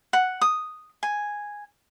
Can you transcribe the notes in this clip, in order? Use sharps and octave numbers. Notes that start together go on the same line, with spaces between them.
F#5
D#6
G#5